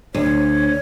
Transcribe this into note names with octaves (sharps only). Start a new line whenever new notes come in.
D2 C#5